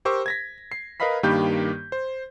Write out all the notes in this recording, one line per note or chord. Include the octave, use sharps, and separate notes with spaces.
G4 A#4 C5 C#6 D6 E6
G#6 A#6 B6
C7
A#4 B4 D#5 F5 B5 B6
G2 D#3 A#3 G4 B5 G6
C5